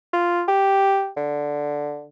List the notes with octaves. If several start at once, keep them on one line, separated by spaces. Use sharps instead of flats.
F4
G4
D3